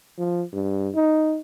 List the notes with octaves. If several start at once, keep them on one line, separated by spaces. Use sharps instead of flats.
F3
G2
D#4